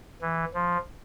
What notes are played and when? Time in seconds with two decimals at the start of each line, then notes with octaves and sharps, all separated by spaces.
0.21 E3
0.54 F3